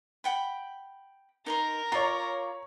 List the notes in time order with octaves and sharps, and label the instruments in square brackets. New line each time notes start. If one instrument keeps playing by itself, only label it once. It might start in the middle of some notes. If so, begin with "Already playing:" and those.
[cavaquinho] F#5 G5 B5
[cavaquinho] D#4 A#5 C6 [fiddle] A#4
[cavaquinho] F4 D5 [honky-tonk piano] C#5 A#5